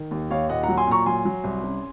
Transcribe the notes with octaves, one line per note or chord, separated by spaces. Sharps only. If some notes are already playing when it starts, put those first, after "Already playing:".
Already playing: D#3
D#2
D#2 C#5 F5
A#2 D#5 F#5
F#5 A#5
F#3
G#5 C6
A#2 A#5 C#6
F#3 G#5 C6
F#3
C2
C#4